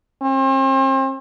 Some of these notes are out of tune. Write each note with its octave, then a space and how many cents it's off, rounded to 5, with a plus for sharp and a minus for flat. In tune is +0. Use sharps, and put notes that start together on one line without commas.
C4 +40